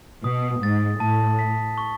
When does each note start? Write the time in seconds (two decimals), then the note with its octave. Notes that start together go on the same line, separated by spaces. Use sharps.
0.24 B2 D#6
0.62 G#2 A6
1.00 A2 A5
1.39 B6
1.78 C#6